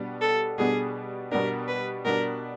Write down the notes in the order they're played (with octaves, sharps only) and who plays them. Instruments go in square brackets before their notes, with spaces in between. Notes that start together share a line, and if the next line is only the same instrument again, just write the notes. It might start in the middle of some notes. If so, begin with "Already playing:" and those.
Already playing: [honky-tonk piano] B2 G3 B3 D4
[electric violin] A4
[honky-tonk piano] B2 G3 B3 D4 [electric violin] G#4
[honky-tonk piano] B2 G3 B3 D4 [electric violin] A#4
[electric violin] B4
[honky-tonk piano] B2 G3 B3 D4 [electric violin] A#4